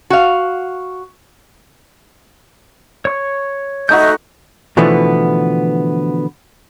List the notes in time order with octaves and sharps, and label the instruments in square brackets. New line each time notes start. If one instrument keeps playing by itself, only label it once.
[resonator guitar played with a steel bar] F#4 F5
[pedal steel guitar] C#5 C#6
[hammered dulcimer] A3 D#4 F#4 [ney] D#5 [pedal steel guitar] E5 G#5 G6
[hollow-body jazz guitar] B2 D3 E3 F3 A3 B3